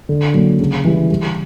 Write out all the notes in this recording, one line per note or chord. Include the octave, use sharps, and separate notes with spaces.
D3
F#3 A#3 D4
C#3
E3 G3
G3